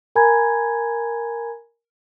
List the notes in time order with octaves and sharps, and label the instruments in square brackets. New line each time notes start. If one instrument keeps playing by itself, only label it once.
[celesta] A#4 G#5 A#5 B5 G#6